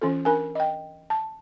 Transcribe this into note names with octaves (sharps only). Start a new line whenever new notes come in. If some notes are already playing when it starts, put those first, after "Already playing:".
E3 C#4 F4 A4
D4 A#4 G#5
D#5 G5
A5